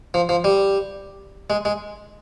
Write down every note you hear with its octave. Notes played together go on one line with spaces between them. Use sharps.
F3
F3
G3
G#3
G#3